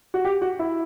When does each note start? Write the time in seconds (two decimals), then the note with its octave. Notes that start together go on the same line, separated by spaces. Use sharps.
0.14 F#4
0.25 G4
0.42 F#4
0.59 E4